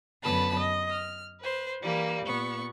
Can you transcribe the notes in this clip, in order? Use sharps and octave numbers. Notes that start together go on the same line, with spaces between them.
F#2 D3 B3 B4 A5 B5
D#5
F6
B4 C5
E3 G3 A#3
A#2 B3 C#6